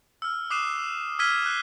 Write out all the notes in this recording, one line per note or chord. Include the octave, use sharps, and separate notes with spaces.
E6 F6
D6 D#6 F#6 C7 D#7 E7
E6 F6 G#6 B6 D#7 G7
F#6 C7